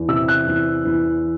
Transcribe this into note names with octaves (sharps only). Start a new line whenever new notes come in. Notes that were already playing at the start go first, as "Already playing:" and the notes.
Already playing: E2
C3 E6
F#6
E2
E2